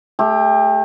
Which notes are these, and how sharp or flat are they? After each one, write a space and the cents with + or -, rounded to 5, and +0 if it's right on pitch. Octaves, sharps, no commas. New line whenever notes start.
A3 -15 G4 +25